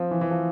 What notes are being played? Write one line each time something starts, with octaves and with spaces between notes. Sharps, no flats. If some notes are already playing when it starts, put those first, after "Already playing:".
Already playing: F3 C4
E3
E3
F3